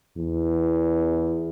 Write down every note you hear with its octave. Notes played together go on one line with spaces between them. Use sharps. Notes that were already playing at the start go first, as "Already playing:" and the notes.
E2